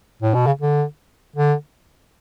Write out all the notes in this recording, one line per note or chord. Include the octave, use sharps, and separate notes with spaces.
A2
B2
C#3
D3
D3